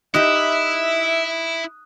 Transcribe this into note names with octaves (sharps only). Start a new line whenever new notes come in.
D#4 E4 G4 E5 D#6 F#6